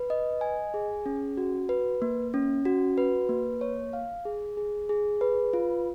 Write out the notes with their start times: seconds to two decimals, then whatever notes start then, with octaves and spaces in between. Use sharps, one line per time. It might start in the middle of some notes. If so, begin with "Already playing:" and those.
Already playing: B4
0.10 D#5
0.41 G#5
0.74 G#4
1.06 C#4
1.37 F#4
1.69 B4
2.02 A#3
2.34 C#4
2.65 F#4
2.98 B4
3.29 A#3
3.61 C#5
3.93 F5
4.25 G#4
4.57 G#4
4.89 G#4
5.21 B4
5.53 F4